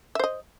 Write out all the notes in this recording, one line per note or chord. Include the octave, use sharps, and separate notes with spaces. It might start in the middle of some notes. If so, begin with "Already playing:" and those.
C5 D#5 E5